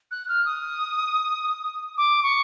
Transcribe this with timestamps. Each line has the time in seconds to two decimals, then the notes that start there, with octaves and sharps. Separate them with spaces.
0.11 F#6
0.28 F6
0.45 D#6
1.98 D6
2.23 C#6